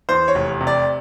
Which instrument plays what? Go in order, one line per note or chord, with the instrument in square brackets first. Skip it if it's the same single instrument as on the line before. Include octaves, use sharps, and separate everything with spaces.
[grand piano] E2 C5
C#5
F1
C3
D5